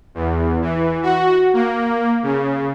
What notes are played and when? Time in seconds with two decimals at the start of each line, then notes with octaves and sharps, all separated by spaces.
0.15 E2
0.62 E3
1.03 F#4
1.53 A#3
2.23 C#3